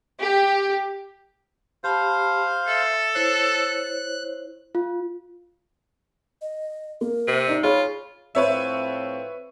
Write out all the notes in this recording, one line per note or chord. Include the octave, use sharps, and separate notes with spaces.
G4
G4 C5 F5 A5 B5
A4 E5
E4 C5 C#5 F#6
F4
D#5
A#3 A#4
C3
D#4 D5 D#5
F4 G#4 C#5 B5
A2 F3 C4 B4 C#5 E5